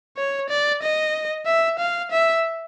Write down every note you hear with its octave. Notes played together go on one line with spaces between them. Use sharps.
C#5
D5
D#5
E5
F5
E5